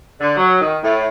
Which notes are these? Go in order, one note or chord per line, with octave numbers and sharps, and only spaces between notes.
D3
F#3
D#3
A2